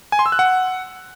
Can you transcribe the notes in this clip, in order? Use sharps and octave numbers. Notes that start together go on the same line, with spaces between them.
G#5
C6
E6
F#6
F#5